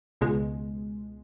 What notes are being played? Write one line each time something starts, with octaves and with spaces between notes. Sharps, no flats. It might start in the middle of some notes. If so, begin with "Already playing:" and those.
C#2 B2 G#3